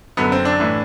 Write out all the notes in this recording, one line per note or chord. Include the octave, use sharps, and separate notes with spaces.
F#2 D3 B3
C4
D4
A2 E3